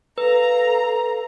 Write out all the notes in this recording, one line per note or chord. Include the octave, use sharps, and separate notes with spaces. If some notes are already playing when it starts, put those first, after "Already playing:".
A4 B4 F5 A#5